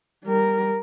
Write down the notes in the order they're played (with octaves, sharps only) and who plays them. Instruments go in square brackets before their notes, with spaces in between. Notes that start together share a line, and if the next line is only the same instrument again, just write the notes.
[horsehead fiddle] G3 A#4